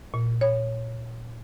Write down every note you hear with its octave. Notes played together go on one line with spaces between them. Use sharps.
A#2
C#5